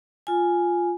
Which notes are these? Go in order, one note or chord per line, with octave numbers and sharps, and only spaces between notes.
F4 G#5